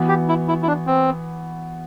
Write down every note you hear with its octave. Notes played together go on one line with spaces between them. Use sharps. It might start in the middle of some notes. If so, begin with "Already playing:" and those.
Already playing: E3 B3 F#4
G4
E4
E4
E4
D4
C4